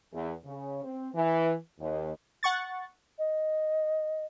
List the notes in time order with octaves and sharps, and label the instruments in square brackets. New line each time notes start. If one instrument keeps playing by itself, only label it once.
[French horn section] E2
C#3
C4
E3
D#2
[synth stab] F#5 C#6 A6
[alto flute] D#5